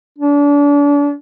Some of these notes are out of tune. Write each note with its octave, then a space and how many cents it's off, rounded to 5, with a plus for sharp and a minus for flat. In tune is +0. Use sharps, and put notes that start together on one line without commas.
D4 -35